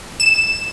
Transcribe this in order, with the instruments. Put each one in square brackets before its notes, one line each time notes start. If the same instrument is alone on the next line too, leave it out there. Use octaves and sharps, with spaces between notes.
[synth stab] E7